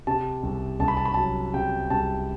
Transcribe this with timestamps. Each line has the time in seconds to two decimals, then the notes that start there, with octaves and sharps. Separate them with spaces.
0.07 C3 A5
0.43 C2
0.80 C2 A5
0.88 B5
0.97 A5
1.05 B5
1.14 F#3 A5
1.54 C3 G5
1.90 C2 A5